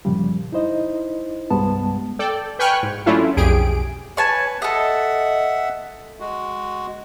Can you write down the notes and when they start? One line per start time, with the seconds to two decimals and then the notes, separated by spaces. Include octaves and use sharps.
0.05 F#2 A#2 C#3 F3 G3
0.52 D#4 E4 C5 D#5
1.50 C2 G2 G3 G#3 B3 A5
2.19 A4 D5 G5
2.59 B4 G5 G#5 C#6 F6 F#6
2.83 G#2
3.06 F#3 A3 C#4 D4 E4 F4
3.37 B1 F2 G4 G#4 D7
4.17 B4 C#5 G#5 A5
4.62 A4 D#5 E5 F#5
6.20 G#3 F#4